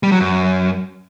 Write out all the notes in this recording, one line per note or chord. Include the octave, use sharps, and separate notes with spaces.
G3
F#3
F#2